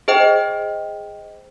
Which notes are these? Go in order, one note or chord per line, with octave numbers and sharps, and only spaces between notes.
G#4 C5 D#5 G5